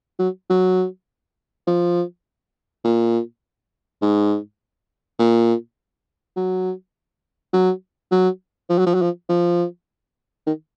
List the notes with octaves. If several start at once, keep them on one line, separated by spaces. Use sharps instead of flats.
F#3
F#3
F3
A#2
G#2
A#2
F#3
F#3
F#3
F3
F#3
F3
F#3
F3
F3
D#3